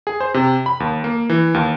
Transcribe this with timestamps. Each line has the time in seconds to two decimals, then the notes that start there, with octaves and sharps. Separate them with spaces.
0.07 G#4
0.20 C5
0.34 C3
0.66 B5
0.80 D#2
1.04 A#3
1.29 E3
1.54 D#2